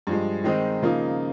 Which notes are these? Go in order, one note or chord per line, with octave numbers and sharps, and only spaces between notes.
G2 F3 G#3
D#3 G#3 C4 D#4
C#3 F3 A#3 D#4